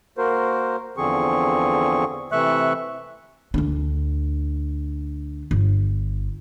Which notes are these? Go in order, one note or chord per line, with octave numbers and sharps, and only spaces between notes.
A#3 F#4 A#4 C5
E2 D3 F3 C4 G#4 C#6
C3 E3 A3 E5 C#6 F#6
D2 D4
G1